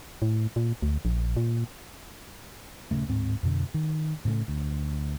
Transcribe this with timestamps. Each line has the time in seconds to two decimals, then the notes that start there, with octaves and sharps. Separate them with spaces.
0.22 A2
0.56 A#2
0.82 D2
1.05 A#1
1.37 A#2
2.91 D#1 B1 C#3 A3
3.09 D1 G#2 C4
3.43 F2 B2 D3
3.74 D#3
4.25 A2 C#3 G3 A3
4.48 D2